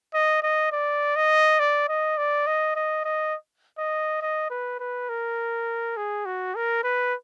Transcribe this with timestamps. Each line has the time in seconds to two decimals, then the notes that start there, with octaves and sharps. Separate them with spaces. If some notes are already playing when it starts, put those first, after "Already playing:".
0.14 D#5
0.42 D#5
0.72 D5
1.16 D#5
1.59 D5
1.88 D#5
2.18 D5
2.47 D#5
2.75 D#5
3.05 D#5
3.78 D#5
4.22 D#5
4.51 B4
4.80 B4
5.09 A#4
5.97 G#4
6.26 F#4
6.55 A#4
6.83 B4